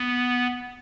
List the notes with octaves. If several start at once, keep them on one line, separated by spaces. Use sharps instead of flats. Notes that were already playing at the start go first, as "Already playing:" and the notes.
Already playing: B3